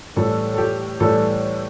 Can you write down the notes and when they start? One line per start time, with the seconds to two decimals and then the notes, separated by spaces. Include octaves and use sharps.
0.16 A2 E3 G3 A4
0.54 A4
0.58 G4
1.00 A2 E3 G3 A4